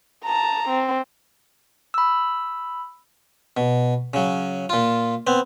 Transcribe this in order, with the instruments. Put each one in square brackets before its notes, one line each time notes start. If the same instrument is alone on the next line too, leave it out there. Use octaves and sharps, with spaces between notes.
[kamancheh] A5 A#5
C4
[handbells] B5 E6
[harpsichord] B2
C#3 F#3
A#2 F4
B3 C4